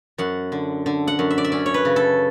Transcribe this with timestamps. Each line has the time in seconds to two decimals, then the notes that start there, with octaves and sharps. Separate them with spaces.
0.18 F#2 F#5
0.52 D3
0.86 D3
1.07 F#5
1.19 F#2
1.30 E5
1.38 D5
1.44 E5
1.52 C#4 D5
1.66 C#5
1.74 B4
1.85 C#3
1.96 A4